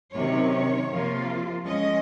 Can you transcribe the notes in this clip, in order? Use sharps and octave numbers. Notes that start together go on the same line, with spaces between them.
C3 D#3 F#3 C#4 C#5
C3 F3 A#3 F4
F3 G#3 C#4 D#5